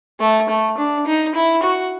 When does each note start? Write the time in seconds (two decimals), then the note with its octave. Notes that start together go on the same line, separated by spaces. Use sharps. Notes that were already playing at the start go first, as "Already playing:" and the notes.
0.20 A3
0.49 A3
0.78 D4
1.07 D#4
1.35 E4
1.63 F#4